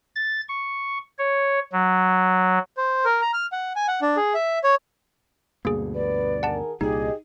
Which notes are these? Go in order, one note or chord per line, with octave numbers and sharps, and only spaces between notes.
A6
C#6
C#5
F#3
C5
A#4
A#5
F6
F#5
G#5
F#5
D4
G#4
E5
C#5
D2 G2 B2 A#3 G#4
B3 B4 D5
D#3 G#4 A#4 F#5 A5
C2 A#2 G3 D#4 G4 G#4 D#5